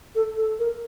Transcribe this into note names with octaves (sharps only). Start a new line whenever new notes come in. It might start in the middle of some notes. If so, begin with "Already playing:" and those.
A4
A4
A#4